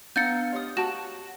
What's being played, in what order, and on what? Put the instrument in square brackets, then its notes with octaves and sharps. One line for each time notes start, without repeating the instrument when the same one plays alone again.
[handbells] B3 D4 F5 [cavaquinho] A#5 [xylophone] G6 A6 C#7
[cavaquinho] F4 D#6 [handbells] G4 C#5 D#5
[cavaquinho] F#4 [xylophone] A5 E7